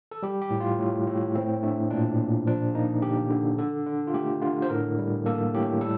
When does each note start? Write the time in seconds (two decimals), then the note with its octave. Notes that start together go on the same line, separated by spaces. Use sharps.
0.11 A4
0.23 G3 G4
0.42 G4
0.50 A2
0.60 F4
0.79 A2
1.07 A2
1.35 A3 C4
1.63 A3 D4
1.90 A#2 D4
2.19 A#2
2.47 F3 D4
2.74 A#3 D#4
3.02 D3 G4
3.30 D3
3.58 D3 A4
3.86 D3
4.07 F4
4.14 A3 G4
4.41 D3 F4
4.62 C5
4.70 A2 A#4
4.98 G3
5.26 A#3 A4
5.54 A2 G4
5.81 G3 A4